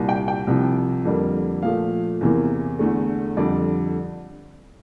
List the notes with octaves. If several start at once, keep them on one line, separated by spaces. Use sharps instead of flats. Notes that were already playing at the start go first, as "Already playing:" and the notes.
Already playing: C2 A#2 G3
G5
G5
C2 C3 F3
F2 D3 G3 A#3
A#2 F3 A3 F5
E2 C3 E3 A#3
E2 D3 A3
F2 D3 G3 D5